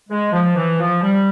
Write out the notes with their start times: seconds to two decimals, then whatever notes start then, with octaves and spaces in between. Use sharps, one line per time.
0.10 G#3
0.33 F3
0.56 E3
0.80 F3
1.03 G3